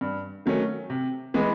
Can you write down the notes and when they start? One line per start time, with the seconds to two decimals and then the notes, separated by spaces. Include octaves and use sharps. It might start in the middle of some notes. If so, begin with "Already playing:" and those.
0.01 G2
0.46 D#3 F#3 A3 C#4
0.90 C3
1.34 E3 G#3 B3